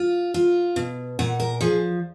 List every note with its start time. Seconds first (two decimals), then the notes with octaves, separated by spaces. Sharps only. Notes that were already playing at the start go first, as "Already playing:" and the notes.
Already playing: F4
0.34 F4
0.76 B2
1.19 A#2 F#5
1.40 A#4
1.61 F3 G#4